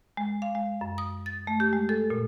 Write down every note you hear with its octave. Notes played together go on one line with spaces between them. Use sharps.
G#3
F5
G#3
F#2
D#6
A6
A3
G4
G#3
A4
A#2